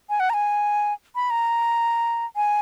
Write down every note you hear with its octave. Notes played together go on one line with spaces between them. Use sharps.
G#5
F#5
A#5
G#5
B5
A#5
G#5